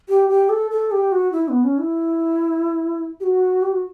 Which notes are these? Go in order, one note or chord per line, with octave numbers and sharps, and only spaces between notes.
G4
G4
A4
A4
G4
F#4
E4
B3
C#4
E4
G4
F#4
G4
F#4